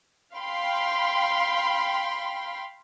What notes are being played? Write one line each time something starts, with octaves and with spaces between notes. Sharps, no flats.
F5 G5 B5 C6